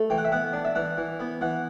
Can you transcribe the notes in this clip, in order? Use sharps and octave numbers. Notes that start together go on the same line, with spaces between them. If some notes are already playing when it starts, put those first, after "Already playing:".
Already playing: A3
E3 G5
F#5
E5
B3 F#5
D4
E5
E3 F#5
E3
B3
E3 F#5